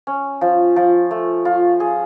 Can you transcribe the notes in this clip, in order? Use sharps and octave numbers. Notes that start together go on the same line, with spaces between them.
C#4
F3
F3
A3
F4
G#4